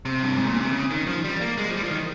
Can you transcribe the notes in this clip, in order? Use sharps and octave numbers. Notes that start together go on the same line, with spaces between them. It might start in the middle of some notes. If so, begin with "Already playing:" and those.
C3
G2
G#2
A#2
C3
C#3
D#3
F3
G3
A#3
G#3
F3
G3
F3
D#3